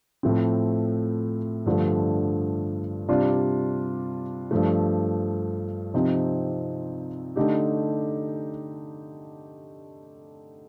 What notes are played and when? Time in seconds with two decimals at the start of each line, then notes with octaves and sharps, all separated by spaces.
0.23 A2 F3 A3 C4
1.66 G2 D3 F3 A3
3.09 C3 G3 D4 F4
4.51 G2 F3 A3
5.94 C3 F3 C4 D#4
7.36 D3 A3 D#4 G4